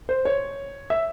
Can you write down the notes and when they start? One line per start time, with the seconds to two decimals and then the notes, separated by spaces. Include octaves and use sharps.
0.09 C5
0.25 C#5
0.90 E5